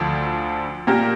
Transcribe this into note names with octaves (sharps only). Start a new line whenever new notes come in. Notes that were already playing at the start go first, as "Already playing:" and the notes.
Already playing: D2 D3 F3 D4
A#2 A#3 G4 A#4